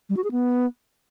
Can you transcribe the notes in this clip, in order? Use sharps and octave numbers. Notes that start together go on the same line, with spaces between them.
G3
F#4
G#4
B3